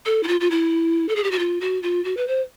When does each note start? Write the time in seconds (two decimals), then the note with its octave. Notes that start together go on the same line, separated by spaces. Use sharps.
0.06 A4
0.23 E4
0.28 F4
0.40 F4
0.51 E4
1.09 A4
1.16 G#4
1.24 G4
1.31 F#4
1.39 F4
1.61 F#4
1.83 F4
2.05 F#4
2.17 B4
2.28 C5